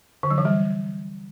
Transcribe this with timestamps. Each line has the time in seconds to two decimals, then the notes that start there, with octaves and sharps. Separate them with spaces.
0.23 D3
0.31 F#3
0.38 E3
0.45 G3